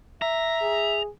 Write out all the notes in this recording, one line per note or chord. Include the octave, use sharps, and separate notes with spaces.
E5 A#5
G#4